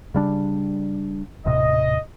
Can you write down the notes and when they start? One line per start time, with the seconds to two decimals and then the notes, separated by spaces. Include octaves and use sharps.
0.14 C#3 G3 D4
1.46 D#1 A2 C3 D#5